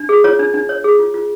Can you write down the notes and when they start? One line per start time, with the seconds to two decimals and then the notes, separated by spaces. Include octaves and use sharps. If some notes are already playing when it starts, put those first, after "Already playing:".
Already playing: D4
0.09 G#4
0.24 F4 C#5
0.39 D4
0.54 D4
0.69 C#5
0.84 G#4
0.99 F4
1.14 F4